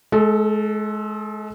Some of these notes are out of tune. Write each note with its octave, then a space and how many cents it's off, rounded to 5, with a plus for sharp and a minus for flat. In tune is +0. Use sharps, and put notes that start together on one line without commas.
G#3 +35 A4 +0